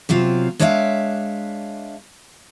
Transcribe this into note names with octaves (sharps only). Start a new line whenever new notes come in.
C3 F#3 C4 F4
G#3 D4 C#5 D5 E5 F5